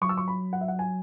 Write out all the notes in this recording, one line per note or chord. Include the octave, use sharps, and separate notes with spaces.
F#3 C#6
E6
C#6
B5
F#5
E5
F#5
G#5